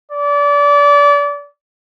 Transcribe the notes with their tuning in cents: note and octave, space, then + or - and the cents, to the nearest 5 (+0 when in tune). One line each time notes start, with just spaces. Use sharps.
D5 -30